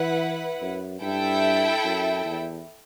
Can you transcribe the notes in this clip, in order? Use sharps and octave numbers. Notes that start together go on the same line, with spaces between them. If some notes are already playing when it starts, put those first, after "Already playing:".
Already playing: E3 E4 B4 F#5
F#2
G2 E4 A4 E5 G5
F#2
E2